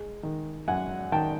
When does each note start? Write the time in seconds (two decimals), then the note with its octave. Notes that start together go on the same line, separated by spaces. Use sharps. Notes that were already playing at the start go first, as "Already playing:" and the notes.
Already playing: G#3
0.23 D#3
0.68 F#2 F#5 G#5
1.12 D#3 G5 A5